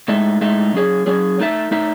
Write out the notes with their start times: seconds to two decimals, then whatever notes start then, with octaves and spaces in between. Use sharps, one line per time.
0.08 A2 G#3 D#4 A4 E5
0.41 A2 G#3 D#4 A4 E5
0.74 F#3 C#4 G#4 C#5
1.06 F#3 C#4 G#4 C#5
1.39 A3 D#4 A4 E5
1.71 A3 D#4 A4 E5